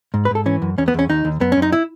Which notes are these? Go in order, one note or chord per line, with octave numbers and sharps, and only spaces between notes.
G#2
B4
G#2 A4
E3 C#4
F#2
E2 C#4
B3
E2 C#4
D#2 D#4
D#2
F#2 B3
F#2 C#4
D#4
E4